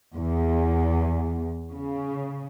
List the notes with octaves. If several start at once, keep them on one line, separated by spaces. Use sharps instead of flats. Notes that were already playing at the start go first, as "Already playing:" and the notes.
E2
C#3